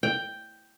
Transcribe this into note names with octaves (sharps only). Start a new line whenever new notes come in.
G5